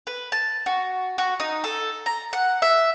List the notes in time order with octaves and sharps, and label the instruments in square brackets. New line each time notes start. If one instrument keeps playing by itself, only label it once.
[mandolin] B4
A5
F#4
F#4
D#4
A4
A#5
F#5
E5